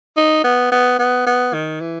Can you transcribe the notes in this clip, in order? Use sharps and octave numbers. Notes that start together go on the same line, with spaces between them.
D#4
B3
B3
B3
B3
D#3
E3